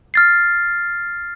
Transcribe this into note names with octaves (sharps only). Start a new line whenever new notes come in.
F6 A6 C7